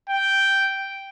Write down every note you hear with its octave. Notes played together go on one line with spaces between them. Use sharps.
G5